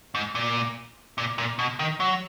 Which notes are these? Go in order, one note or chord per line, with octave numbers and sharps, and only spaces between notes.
G#2
A#2
A#2
A#2
B2
D#3
F#3